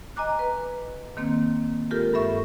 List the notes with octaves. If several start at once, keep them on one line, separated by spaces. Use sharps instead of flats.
D#5 G#5 A#5 D6 F#6
B4
D#3 A#3 C4
G#3 F4 G4 A4 A#4
G2 A4 E5 C#6